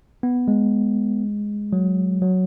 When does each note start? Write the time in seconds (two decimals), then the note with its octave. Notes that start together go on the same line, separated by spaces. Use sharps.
0.23 B3
0.48 G#3
1.73 F#3
2.22 F#3